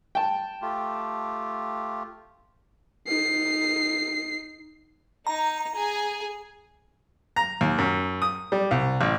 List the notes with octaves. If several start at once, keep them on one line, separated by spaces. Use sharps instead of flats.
G5 A5
A3 F4 G4
D#4 C7
D#4 A#5
G#4 G#5
A#5
D#2
F#2
D#6
G3
C2
A1